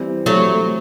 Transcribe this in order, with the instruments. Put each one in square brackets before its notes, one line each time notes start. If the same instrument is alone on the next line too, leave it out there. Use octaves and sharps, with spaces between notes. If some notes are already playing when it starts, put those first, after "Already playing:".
Already playing: [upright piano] E3 G3 C4
[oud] F#3 A3